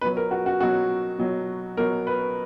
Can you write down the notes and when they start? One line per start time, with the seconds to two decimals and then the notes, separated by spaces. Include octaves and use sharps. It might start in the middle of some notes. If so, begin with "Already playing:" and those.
0.01 B2 F#3 B4
0.17 A#4
0.31 F#4
0.46 F#4
0.60 B2 F#3 F#4
1.19 B2 F#3
1.77 B2 F#3 A#4
2.07 B4